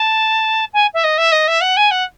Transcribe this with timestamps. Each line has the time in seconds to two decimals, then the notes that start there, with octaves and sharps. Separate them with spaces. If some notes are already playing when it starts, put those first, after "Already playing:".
Already playing: A5
0.73 G#5
0.94 E5
1.04 D#5
1.18 E5
1.32 D#5
1.47 E5
1.61 F#5
1.77 G#5
1.91 F#5